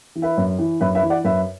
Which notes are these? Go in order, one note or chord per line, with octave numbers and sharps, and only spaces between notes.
E3
B4 E5
F#2
E3
F#2 B4 E5
B4 E5
E3
D5 F#5
F#2 B4 E5